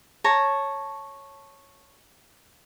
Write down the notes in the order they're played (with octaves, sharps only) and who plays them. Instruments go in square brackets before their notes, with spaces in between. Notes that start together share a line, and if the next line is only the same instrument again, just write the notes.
[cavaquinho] C#5 A5 A#5